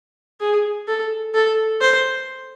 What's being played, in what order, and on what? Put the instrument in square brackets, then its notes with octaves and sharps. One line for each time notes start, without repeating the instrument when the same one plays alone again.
[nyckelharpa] G#4
A4
A4
C5